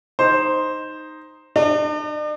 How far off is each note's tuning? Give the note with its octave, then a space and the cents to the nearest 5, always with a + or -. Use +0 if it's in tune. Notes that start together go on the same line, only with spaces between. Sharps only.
D#4 +0 C5 +0
D4 +45 D5 +40